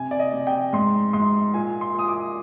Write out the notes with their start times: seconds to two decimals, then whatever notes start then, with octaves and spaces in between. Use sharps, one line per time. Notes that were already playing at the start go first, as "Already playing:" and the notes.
Already playing: C3 G#5
0.11 D5
0.19 D#5
0.33 C3
0.47 G5
0.73 G#2 C6
1.13 G#2 C6
1.54 A#2 G#5
1.81 C6
1.94 A#2 D#6
2.08 D6